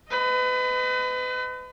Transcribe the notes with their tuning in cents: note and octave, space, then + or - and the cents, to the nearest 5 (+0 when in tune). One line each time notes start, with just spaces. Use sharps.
B4 +35 D#5 +0